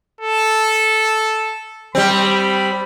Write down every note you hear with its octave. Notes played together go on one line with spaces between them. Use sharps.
A4
G3 C4 B5